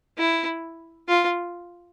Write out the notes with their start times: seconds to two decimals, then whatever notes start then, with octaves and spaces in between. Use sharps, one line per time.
0.18 E4
1.08 F4